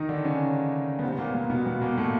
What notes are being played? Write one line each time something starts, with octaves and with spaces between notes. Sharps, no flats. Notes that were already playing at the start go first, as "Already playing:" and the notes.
Already playing: D#3 D#4
D3 D4
C#3 C#4
B3
C3 C4
B3
A#2 A#3
A#2 A#3
B2 B3
B2 B3
A#2 A#3
A2 A3